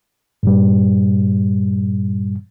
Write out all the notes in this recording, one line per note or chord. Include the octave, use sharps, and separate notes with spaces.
G2 A#2 G3